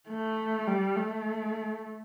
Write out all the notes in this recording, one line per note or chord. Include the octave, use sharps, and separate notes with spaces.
A3
G3
A3